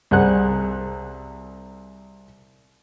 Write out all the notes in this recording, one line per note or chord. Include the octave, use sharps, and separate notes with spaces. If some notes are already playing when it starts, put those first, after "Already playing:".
C2 G3 G#4 F#5 F#6